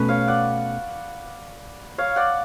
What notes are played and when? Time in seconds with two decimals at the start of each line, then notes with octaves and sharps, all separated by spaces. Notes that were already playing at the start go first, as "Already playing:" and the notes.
Already playing: B2 A3 C#4 B4
0.09 C#5 F5
0.28 D5 F#5
1.98 C#5 F5
2.16 D5 F#5